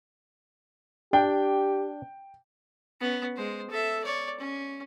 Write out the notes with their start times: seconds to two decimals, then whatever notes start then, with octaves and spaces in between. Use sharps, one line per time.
1.13 D4 G4 G5
3.01 B3 C#4
3.36 G#3 C5
3.70 A4 E5
4.03 C#5 D5
4.40 C#4